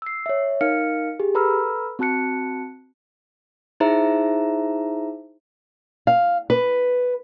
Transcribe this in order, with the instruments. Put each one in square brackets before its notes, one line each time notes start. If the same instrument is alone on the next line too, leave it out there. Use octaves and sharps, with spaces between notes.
[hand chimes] E6 C7
C#5 E5
D#4 A#4 F5 F6 C#7
G4 G#4
A4 B4 A#5 B5 E6 F6
C4 F#4 A5 F#6 C#7
D#4 E4 G#4 C5 E5 A#5
[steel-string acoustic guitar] F5
B4